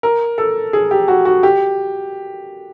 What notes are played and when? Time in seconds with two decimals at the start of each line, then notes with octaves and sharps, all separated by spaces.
0.03 A#4
0.38 A4
0.73 G#4
0.91 G4
1.08 F#4
1.25 F#4
1.43 G4